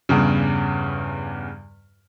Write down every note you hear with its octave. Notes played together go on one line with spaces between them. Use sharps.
E2 G2 C#3